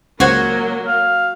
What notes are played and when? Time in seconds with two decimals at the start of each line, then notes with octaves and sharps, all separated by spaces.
0.20 C#2 F#3 A#3 F#4 A#4 C5 C#5 F#5
0.87 F5